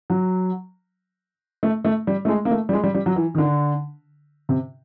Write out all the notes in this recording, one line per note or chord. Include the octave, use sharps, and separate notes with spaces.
F#3
A3
A3
G3
A3
G#3
A#3
A3
G3
G#3
G3
G3
F#3
E3
D#3
D3
C3